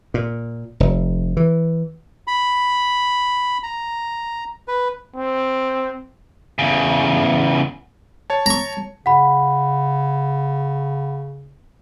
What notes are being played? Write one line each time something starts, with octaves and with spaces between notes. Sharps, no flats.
A#2
F1
E3
B5
A#5
B4
C4
E2 C#3
C#5 A5
A#5 C#6
C#3 F#5 B5